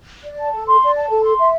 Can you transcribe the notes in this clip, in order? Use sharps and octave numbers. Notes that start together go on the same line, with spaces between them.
D5
A5
A4
C6
D5
A5
A4
C6
E5